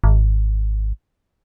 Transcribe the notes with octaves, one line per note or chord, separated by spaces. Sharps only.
G#1